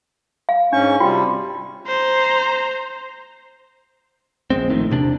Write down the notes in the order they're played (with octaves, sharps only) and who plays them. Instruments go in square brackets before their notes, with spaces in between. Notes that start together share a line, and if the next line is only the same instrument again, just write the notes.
[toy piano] F5
[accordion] G#2 C#4 C#6 [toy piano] D4
[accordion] C3 G3 [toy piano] F4 F#4 G5
[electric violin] C5 A#5
[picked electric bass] A#1 G#2 G#3 C4
A#1 A2 D#3
E1 C3 D4